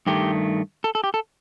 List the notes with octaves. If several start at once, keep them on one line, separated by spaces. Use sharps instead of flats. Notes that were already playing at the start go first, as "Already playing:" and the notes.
G2 D#3 A3 G4
A4
A4
G4
A4